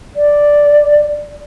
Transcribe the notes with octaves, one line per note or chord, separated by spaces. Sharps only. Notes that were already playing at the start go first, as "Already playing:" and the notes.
D5